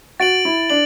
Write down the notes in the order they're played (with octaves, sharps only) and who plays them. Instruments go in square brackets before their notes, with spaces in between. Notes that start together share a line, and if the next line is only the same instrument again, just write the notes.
[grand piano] F#4 [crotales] A6 D7 F#7
[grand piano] E4
[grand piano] D4 [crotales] F#7